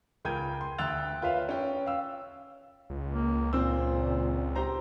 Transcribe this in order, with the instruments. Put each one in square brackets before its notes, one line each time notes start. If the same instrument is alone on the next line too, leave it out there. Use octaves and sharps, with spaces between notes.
[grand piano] C#2 A#4 G5 G6 G#6 D#7
C6
D2 G5 E6 F#6 A6 F7
F4 A#4 B4 C#5 E5 F5
C#4 G5
F5 E6
[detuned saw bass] C#2
[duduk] A#3
[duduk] A#2 [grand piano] C4 C5 E6
[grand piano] G4 C5 A#5